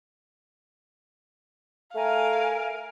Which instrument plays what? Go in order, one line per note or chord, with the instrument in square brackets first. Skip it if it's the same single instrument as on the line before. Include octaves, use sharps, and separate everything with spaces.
[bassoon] A3 [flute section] A#4 G#5 [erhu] F5